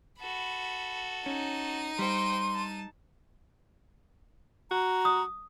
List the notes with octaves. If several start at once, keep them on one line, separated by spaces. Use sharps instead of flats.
F#4 A4 B5
C#4 D#4 D#7
G3 C5 G5 C6
A5
F#4 A#5
D#6